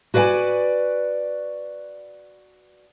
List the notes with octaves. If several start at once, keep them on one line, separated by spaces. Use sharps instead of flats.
F#4 B4 D5 E5 G#5